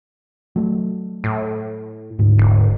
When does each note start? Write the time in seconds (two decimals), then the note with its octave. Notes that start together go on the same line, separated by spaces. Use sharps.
0.56 F#3 A3
1.24 A2
2.19 D2 G#2
2.39 E1